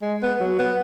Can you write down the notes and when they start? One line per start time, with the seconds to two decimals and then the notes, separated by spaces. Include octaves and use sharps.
0.02 G#3
0.23 B3
0.40 F#3
0.59 B3